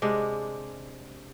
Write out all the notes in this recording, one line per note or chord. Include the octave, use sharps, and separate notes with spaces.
C3 G#3 D4